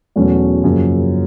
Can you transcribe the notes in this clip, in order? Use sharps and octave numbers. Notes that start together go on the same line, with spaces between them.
E2 B2 F#3 A3 C#4
F#2 C#3 F3 A#3